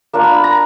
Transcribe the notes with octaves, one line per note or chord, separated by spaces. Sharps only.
A#3 D4 F4 A#5
B5
B5
A#5